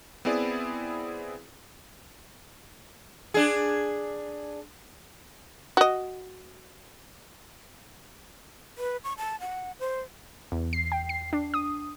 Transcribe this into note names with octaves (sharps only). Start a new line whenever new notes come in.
B3 C4 E4 G#4 D5
D4 G#4
F#4 D#5
B4
C#6
A5
F#5
C5
E2
C7
G5
C7
D4
D#6